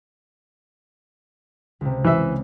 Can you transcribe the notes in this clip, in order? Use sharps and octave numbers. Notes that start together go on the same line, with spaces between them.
C#2 C3
C#3 E3 E5